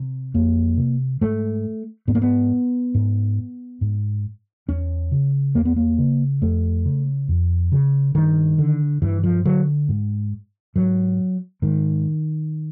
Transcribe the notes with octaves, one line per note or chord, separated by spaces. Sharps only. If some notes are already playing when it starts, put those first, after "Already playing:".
Already playing: C3
F2 A#3
C3
G#2 A3
G#2 B3
A#3
B3
G#2
G#2
E2 C#4
C#3
E2 A#3
B3
A#3
C#3
F2 A3
C#3
F2
C#3
G2 D#3
D3
G2 E3
F3
D3 F#3
G#2
G#2 F#3
G#2 D#3